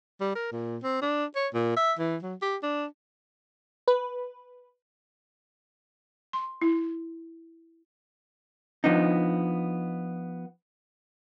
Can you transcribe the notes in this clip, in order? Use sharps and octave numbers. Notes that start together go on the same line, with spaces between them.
G3
A#4
A#2
C4
D4
C#5
A#2
E5
E3
F#3
G4
D4
B4
C6
E4
F3 B3 D4 D#4